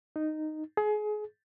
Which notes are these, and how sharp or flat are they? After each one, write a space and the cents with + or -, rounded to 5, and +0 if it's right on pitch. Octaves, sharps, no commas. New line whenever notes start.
D#4 -10
G#4 +30